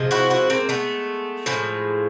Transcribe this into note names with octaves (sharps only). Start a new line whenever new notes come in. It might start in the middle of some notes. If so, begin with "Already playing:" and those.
Already playing: C3 F3 G#3
E4 F#4
E4 F#4
A#3 C4
A3 B3
A2 F3 G#3